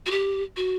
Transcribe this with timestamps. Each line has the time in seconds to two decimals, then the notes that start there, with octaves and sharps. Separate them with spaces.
0.06 F#4
0.11 G4
0.56 F#4